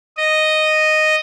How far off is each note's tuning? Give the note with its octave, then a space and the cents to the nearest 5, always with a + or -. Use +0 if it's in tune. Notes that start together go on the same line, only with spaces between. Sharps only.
D#5 -5